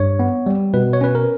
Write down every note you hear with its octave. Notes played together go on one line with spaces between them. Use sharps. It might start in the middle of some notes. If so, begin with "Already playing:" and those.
Already playing: G2 C#5
B3
G3
B2 B4
C#5
C#4 B4
A#4